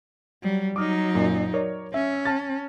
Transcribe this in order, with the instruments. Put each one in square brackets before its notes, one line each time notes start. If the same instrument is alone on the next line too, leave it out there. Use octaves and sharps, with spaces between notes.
[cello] F#3 G3
[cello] F#3 D#4 [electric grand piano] D6 D#6 F6
[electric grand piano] F#2 A#2
A#4 C#5 D5
[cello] C#4 [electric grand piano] E5
[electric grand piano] A5 F6 A6